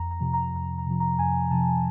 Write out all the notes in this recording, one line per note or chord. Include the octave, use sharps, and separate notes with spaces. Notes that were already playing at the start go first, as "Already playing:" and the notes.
Already playing: F2 A#5
A#5
C3 F3
A#5
F2 A#5
A#5
C3 F3
A#5
F2 G#5
C3 F3 A5